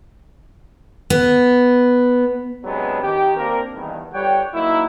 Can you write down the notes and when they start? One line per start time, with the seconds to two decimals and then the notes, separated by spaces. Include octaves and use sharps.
1.10 B3
2.64 C3 F#3 G#3 B3 C4 D4
3.02 D#3 G4
3.36 A#3 C4 D4 A#4
3.74 E2 G2 D#3
4.13 G1 G3 C#5 F#5 G5
4.54 F#3 A#3 D#4 E4